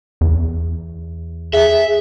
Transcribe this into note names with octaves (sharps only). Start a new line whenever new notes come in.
E2
G#4 E5